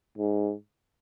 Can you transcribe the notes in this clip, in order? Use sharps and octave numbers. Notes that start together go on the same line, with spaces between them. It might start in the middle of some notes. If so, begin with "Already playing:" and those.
G#2